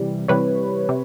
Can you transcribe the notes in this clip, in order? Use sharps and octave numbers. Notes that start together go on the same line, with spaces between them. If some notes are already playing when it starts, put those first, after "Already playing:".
Already playing: C3 E3 G3
C3 E3 G3 B4 C#5
C3